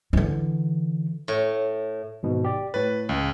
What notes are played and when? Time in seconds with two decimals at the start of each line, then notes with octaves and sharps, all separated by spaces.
0.13 D3 E3
1.28 A2
2.23 G#1 G#2 B2
2.45 G4 D5
2.74 A2 B4 C#5 A6
3.09 C#2